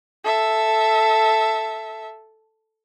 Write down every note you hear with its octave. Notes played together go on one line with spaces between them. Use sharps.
A4 E5